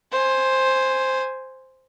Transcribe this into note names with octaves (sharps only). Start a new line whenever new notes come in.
C5 G#5